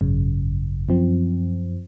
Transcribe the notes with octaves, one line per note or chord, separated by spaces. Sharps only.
G#1 F#2 C#3
F#2 F3 C4